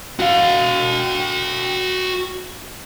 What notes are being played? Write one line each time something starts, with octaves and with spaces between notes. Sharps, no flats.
F#4 F5